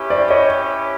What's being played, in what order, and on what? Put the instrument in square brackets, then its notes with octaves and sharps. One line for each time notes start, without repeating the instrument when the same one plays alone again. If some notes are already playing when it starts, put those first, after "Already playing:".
Already playing: [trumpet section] C#4 E4 G4 B4
[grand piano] C5 D5
C#5 D#5